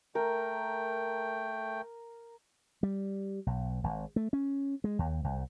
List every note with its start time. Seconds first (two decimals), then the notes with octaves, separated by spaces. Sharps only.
0.15 A3 A#4 G5
2.83 G3
3.46 B1
3.84 G#1
4.16 A3
4.33 C#4
4.84 G#3
4.99 D#2
5.24 C2